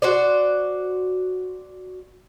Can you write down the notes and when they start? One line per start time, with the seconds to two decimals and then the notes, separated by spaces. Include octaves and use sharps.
0.02 F#4 C5 D5